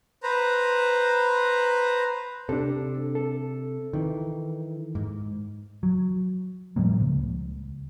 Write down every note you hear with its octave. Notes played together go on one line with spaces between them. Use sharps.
B4 C5 A#5
C3 D4 A4
A4
D#3 E3
G#2
F#3
A2 F3 G3 A#3
C#2